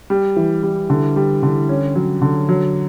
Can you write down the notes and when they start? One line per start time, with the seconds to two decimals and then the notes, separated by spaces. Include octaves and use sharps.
0.10 G3
0.36 E3
0.63 G3
0.90 D3
1.16 G3
1.43 D3
1.69 C#4
1.95 F#3
2.22 D3
2.49 F#3